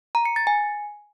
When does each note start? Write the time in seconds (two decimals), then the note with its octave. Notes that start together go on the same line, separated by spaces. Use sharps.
0.15 A#5
0.25 C#7
0.36 A6
0.47 G#5